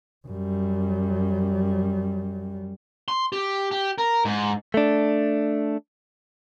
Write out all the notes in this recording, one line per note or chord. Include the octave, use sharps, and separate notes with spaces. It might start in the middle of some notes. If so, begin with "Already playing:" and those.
F#2 G3
C6
G4
G4
A#4
G#2
A3 D4